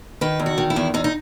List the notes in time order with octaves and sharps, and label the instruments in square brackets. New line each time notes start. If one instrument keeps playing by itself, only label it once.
[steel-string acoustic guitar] D#3 B4
E2
F#4
D#3
E4
E2
E2 D#4
D#4